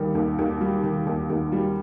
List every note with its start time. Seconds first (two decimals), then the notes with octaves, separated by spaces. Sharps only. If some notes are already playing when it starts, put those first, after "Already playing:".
Already playing: D#2 D#3 G3
0.15 D#2
0.39 D#2
0.61 G3
0.83 D#3
1.07 D#2
1.30 D#2
1.52 G3